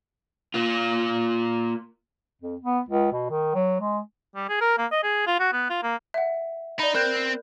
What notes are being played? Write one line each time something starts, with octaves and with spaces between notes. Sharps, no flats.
A#3 F4
F2
B3
C#2
B2
D#3
F#3
G#3
G3
G#4
A#4
A#3
D#5
G#4
F4
F#4
B3
F4
A#3
E5 F#5
D#4 D5 B5
C4 A#4 F#6 G6